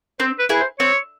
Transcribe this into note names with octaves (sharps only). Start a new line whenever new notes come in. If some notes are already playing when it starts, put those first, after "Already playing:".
C4 C5
B4
E4 G#4 B4
C5
C4 C#5